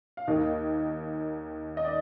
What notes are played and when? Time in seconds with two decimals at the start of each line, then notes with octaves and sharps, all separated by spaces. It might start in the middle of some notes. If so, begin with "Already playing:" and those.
0.17 F5
0.28 D#2 D#3 A#3 D#5
1.77 D#5
1.85 D5